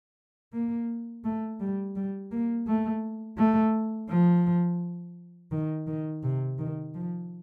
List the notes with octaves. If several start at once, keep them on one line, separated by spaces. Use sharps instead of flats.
A#3
A3
G3
G3
A#3
A3
A3
F3
D#3
D#3
C3
D#3
F3